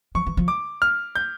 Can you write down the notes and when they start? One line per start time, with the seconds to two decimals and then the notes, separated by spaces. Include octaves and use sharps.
0.15 F3 C#6
0.27 E3
0.37 F3
0.48 D6
0.82 F6
1.15 G6